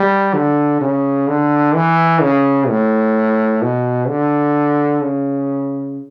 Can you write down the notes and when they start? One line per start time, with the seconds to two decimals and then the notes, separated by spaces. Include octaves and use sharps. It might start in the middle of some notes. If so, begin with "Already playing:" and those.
Already playing: G3
0.34 D3
0.81 C#3
1.28 D3
1.74 E3
2.22 C#3
2.68 A2
3.62 B2
4.08 D3
5.02 C#3